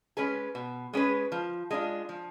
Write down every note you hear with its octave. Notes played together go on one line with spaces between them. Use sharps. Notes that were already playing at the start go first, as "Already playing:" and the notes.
G#3 C#4 G#4 B4
B2
G#3 C#4 G#4 B4
F3
G#3 D4 F4
F3